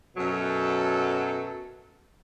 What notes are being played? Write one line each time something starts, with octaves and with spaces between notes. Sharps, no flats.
F#2 B2 F#3 A4